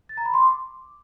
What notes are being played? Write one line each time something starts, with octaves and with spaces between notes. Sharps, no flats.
A6
A#5
B5
C6
D6